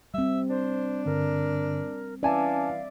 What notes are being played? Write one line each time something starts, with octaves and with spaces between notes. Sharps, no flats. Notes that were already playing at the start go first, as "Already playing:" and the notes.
G3 C4 E5
D4 C5
G2 D3 A#4
E3 C#4 D5 E5 F5 G#5 A5